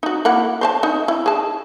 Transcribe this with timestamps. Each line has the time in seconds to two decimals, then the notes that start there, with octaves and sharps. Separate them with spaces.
0.03 D#4 F#4
0.25 A#3 E4 F#5
0.61 C5 C#5 A5
0.83 D#4
1.08 E4
1.26 G#4 A5